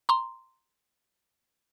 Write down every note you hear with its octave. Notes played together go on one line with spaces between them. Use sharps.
A#5 C6